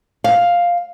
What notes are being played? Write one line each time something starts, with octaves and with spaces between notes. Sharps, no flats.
F5